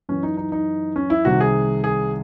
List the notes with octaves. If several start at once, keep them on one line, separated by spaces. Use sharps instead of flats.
F#2 E3 C#4
D#4
D#4
D#4
C#4
E4
C2 C3 D#3 F#4
G#4
G#4